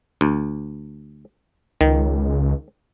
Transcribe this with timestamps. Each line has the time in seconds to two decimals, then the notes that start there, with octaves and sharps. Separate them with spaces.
0.21 D2
1.81 C#2 D#3